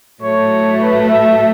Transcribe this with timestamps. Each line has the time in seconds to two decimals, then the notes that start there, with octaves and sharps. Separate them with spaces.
0.22 A2 F#3 A3 C#5
0.81 B4
1.10 E5